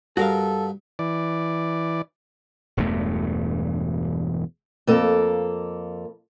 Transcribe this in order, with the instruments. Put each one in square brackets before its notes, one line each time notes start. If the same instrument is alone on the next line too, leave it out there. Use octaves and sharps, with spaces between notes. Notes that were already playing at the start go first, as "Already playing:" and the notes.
[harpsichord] G2 [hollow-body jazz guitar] F#4 A#4 F5 [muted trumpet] A4
[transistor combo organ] E3 D5
[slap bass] E1 E2 G2 A3
[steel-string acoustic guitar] F2 A#3 A4